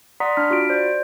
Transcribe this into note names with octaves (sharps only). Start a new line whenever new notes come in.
D5 F#5 A#5 C6 D#6 B6
D4 B5 F6 B6
F4 F#4 B5 D7
C5 D5